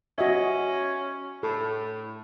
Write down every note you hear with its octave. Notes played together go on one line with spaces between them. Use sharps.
C#4 F#4 D#5 E5
A2 A4